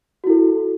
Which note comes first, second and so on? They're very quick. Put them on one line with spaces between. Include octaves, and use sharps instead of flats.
F#4 E4 A4